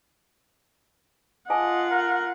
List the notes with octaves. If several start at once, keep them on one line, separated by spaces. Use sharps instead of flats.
F4 G#4 D#5 F#5 G#5 A5
A#4